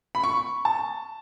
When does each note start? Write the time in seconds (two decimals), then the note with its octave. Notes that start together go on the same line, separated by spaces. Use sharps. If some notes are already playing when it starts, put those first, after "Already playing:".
0.15 B5
0.24 C#6
0.65 A5